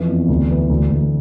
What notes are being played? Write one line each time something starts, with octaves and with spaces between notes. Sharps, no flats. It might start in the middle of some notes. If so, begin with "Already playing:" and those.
Already playing: F2 E3
E2
D2
E3
D2
D2